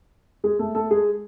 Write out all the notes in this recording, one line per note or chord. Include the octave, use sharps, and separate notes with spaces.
G#3 G#4
A3 A4
A3 A4
G#3 G#4